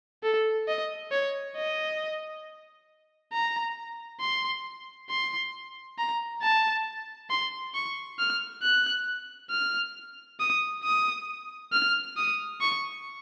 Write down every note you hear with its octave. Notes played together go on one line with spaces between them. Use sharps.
A4
D#5
C#5
D#5
A#5
C6
C6
A#5
A5
C6
C#6
F6
F#6
F6
D#6
D#6
F6
D#6
C#6